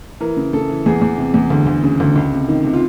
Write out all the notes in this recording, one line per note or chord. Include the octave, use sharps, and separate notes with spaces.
E3 A#4
C#3
C#3 A4
E3
E2 G#4
E2
C3
E2
D2
D2
C#3
D2
C#2
C3
D#3
C3
F4